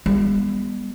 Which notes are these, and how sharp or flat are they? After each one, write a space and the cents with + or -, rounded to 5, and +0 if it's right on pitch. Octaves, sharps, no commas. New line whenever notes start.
G3 +45 B3 -10